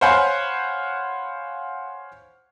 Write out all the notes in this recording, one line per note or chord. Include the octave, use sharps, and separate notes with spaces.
C5 C#5 F5 F#5 G#5 B5